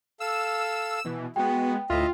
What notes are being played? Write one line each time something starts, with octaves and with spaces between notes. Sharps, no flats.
A4 F5 E6 E7
B2 E3
G#3 B3 F#4 G5
D2 A2 F4 D#5 E5